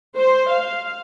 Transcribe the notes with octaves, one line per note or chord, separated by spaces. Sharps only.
C5
F5